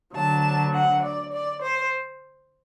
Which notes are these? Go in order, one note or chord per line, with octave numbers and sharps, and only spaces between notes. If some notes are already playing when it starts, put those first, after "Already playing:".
D2 D3 F#3 A5
F#5
D5
D5
C5